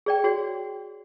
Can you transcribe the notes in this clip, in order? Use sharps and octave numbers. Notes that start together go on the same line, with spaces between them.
G#4 D5 G5
F#4 G#4 C#5